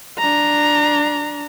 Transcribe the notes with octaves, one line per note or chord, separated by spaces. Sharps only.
D4 A#5